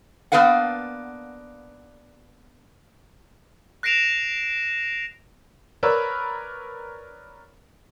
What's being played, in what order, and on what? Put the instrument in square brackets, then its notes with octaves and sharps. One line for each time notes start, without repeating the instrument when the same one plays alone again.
[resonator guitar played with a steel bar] A#3 B3 D4 B4 F5 F#5
[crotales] F#6 A#6 C7 D7 E7 F7
[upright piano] A#4 B4 C#5 D5 B5 E6